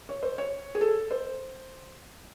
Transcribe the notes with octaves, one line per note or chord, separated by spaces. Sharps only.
C#5
C5
C#5
G#4
A4
C5